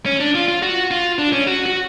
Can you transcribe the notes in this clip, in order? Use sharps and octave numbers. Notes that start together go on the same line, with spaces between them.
C#4
D4
F4
F4
F#4
F4
D4
C#4
F#4
F#4